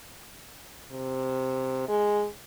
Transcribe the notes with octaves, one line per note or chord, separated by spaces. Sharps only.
C3
G#3